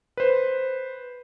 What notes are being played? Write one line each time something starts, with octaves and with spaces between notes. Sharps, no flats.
B4 C5